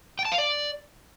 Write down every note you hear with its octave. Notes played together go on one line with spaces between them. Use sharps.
G5
A5
F5
D5